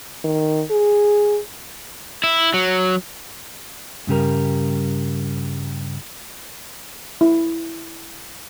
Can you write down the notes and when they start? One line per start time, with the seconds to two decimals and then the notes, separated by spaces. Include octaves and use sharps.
0.24 D#3
0.71 G#4
2.24 E4
2.54 F#3
4.07 G2 C#3 G3 A#4
7.21 E4